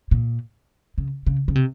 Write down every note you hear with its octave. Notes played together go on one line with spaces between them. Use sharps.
A#2
C#3
C#3
C#3
C3